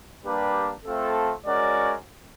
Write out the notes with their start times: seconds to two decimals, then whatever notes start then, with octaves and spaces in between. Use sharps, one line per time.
0.23 G3 A#3 D4 G4 B4
0.84 A3 C4 F4 A4
1.46 G#3 C#4 F#4 A#4 D5